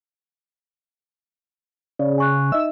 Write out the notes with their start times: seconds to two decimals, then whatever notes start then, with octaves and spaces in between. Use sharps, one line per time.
1.99 C#3 D5
2.18 G#5 C#6 F#6
2.52 D#4 D#5 E5 E6